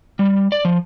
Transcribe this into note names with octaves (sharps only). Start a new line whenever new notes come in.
G3
D5
F3